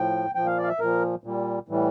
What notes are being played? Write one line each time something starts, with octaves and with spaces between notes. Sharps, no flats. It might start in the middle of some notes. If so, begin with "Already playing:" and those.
Already playing: A2 F3 G5
A#2 F3 G5
F5
D5
F5
E5
A#2 F3 A#4
A#2 G3
A2 E3 G3